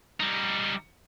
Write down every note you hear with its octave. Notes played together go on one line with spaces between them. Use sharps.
G3 D#4